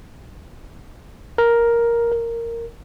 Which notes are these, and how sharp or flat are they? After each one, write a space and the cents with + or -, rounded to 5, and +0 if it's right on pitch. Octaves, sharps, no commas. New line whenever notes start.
A#4 +5
A#4 -10